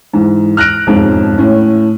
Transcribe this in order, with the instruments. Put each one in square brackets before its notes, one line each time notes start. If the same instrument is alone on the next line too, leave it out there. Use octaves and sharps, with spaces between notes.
[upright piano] G#2 E3
F6 F#6 A#6 D7
E1 F2 G#2
A2 C#4